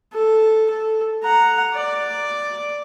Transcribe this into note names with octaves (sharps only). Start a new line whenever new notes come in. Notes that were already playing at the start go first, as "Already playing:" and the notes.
A4
A4
F#5 A#5
D5